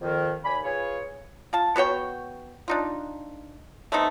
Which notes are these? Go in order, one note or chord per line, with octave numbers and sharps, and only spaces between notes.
F2 D#3
D#2 D5 G#5 B5
F4 G#4 B4 C#5
F4 A5
B3 F#4 C#5 G5
D4 D#4 F4
A3 B3 C4 D#4